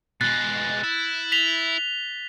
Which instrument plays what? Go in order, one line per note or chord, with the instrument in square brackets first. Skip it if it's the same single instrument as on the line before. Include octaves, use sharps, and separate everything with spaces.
[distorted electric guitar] B2 G#3 [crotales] F#6 A6
[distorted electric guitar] E4
[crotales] B6 F7 G7